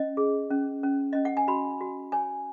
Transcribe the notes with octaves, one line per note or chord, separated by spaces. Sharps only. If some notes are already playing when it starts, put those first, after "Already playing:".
Already playing: C#4 D#5
G#4
C#4
C#4
C#4 D#5
F#5
G#5
F#4 B5
F#4
C#5 G#5